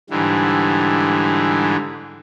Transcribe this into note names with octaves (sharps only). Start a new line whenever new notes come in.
G#2 D3 E3 G3